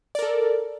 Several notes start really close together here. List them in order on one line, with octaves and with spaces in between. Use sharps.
D5 A#4 A4